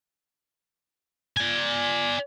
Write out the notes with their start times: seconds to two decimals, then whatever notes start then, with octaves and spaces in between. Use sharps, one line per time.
1.37 D5 G#5